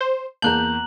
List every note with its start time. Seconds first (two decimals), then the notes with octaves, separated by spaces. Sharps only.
0.01 C5
0.42 E2 A#3 A5 A#5 F#6 G6 F#7